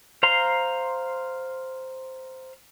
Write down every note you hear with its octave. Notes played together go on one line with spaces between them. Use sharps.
C5 F5 A#5 C6